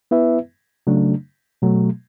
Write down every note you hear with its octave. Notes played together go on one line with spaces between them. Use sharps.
B3 E4 B4 E5
C#3 F#3 A3 D4
B2 F#3 A3